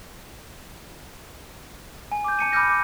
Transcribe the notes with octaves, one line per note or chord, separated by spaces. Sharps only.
G#5
D6 G6
A5 C#7 D#7
B5 D6 E6 F6 G6 A#6
D6